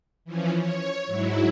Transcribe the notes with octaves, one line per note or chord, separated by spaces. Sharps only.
E3 F3 C#4
C#5
G#2 F#3 E4